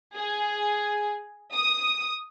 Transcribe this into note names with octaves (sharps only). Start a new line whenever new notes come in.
G#4
D#6